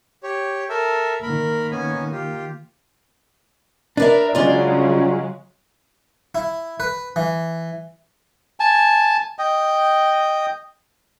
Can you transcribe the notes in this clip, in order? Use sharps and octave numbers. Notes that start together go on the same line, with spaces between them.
G4 C#5
A4 A#4 E5
D#3 A#3 A#4 B5
B3 C#4 G#5
F4 G4
D4 A#4 B4 D5 E5
C#3 F#3 G#3 F4 D5
E4
B4
E3
G#5 A5
D#5 G5